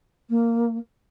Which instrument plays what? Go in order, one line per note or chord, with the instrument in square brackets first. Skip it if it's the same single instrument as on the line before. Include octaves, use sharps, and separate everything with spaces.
[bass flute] A#3